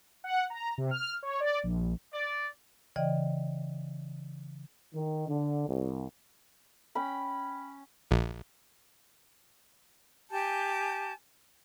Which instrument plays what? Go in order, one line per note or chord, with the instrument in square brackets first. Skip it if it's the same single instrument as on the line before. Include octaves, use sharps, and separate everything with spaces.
[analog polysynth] F#5
A#5
C3
F6
C#5
D5
A#1
[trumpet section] D5
[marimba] C#3 E3 D5 D#5 G5
[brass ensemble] D#3
D3
C2
[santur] C#4 G5 B5
[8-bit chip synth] A#1
[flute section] G4 G#5 A5 G6